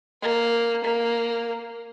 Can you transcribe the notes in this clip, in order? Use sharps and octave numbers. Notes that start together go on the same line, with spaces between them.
A#3
A#3